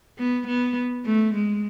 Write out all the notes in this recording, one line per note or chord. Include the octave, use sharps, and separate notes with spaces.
B3
B3
A3
G#3